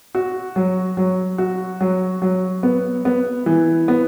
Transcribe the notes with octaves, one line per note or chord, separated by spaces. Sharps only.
F#4
F#3
F#3
F#4
F#3
F#3
B3
B3
E3
B3